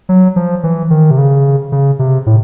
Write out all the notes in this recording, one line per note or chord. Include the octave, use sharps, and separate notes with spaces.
F#3
F3
E3
D#3
C3
C#3
C#3
C3
A2